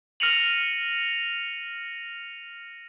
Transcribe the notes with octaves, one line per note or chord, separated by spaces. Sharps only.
F6 A#6 C#7 D#7 F7 F#7